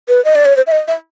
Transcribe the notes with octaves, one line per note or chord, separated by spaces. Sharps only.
B4
D#5
D5
C#5
C5
E5
D#5
E5